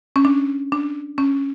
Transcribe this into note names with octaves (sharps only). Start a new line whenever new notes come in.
C#4
D4
D4
C#4